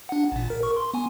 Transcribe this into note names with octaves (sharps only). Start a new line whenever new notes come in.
D4 F#5
A1 A#2
A#4
A#4 C#6
C6
B3 G#5